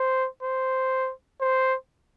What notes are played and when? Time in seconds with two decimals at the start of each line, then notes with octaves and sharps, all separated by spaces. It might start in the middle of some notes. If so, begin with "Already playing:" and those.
Already playing: C5
0.43 C5
1.41 C5